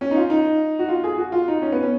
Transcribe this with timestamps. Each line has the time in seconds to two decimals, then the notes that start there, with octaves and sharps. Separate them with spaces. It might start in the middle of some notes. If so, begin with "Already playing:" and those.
0.01 C#4
0.11 D#4
0.16 F4
0.30 D#4
0.79 F#4
0.88 F4
1.04 G#4
1.18 F#4
1.32 F4
1.48 D#4
1.62 C#4
1.72 B3
1.83 C#4